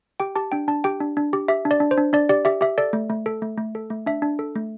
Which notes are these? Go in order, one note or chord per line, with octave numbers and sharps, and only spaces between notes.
G4 G5
G4 A5
D4 G5
D4 A5
G4 G5
D4
D4
G4
G4 E5
D4
D5
D4
C5
D4
D4 D5
G4 D5
G4 E5
G4 E5
A4 D5
A3
A3
A4
A3
A3
A4
A3
D4 E5
D4
A4
A3